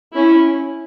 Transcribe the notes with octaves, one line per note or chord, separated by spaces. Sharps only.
C#4 E4